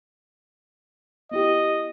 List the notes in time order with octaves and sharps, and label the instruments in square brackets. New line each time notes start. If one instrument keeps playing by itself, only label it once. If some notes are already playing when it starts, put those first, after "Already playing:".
[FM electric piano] B3 E4 G4 [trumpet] D#5